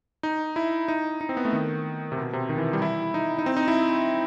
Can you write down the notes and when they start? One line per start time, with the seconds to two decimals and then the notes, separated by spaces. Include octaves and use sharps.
0.23 D#4
0.56 E4
0.88 D#4
1.21 D#4
1.29 C4
1.37 B3
1.45 A3
1.53 D#3
2.12 C3
2.17 B2
2.33 C3
2.49 D#3
2.58 E3
2.73 G3
2.82 E4
3.14 D#4
3.38 D#4
3.46 C4
3.57 D#4
3.68 E4